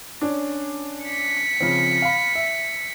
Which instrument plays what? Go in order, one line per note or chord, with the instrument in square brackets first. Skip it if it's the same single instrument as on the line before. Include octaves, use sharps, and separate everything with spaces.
[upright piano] C#4 D4
[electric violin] B6 C#7
[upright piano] C#3 F3 C4
F5 B5
E5